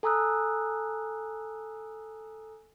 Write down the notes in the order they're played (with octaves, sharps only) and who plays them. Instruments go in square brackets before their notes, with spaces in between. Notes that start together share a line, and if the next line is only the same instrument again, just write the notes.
[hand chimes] A4 G#5 A#5 D#6 E6 F#6